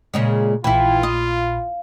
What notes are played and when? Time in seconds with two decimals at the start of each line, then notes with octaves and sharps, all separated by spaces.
0.14 A#2 C#3 G#3
0.64 A#1 A#2 E3 E4 F4 G5 B5
1.03 D#5 F5